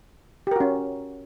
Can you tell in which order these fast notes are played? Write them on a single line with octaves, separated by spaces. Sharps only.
G4 A#4 F#4 C#4